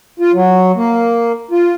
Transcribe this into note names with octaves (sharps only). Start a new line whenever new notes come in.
F4
F#3
A#3
F4